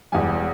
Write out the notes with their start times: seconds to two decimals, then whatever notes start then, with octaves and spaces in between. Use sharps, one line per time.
0.12 E1 E2 E3 G3 G#5